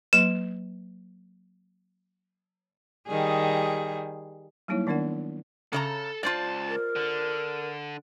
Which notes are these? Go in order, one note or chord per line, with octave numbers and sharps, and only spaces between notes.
F#3 A#3 E7
D#3 G3 G#4
F#3 G3 A#3 D#4 E4 C#5
D#3 B3 D4 A#4 D5 F#5
C#3 A4 D5 A#5
C#2 F4 C5 D5 A5
A#4
D3